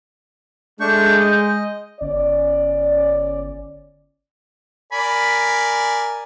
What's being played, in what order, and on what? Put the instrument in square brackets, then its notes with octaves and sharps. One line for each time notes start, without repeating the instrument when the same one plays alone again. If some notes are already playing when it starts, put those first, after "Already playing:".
[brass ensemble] G#3 [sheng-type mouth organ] A3 D4 C#6 [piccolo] G6
[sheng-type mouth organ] D#5
[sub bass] G1 [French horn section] C#4 D5
[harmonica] A#4 D5 G#5 [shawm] B5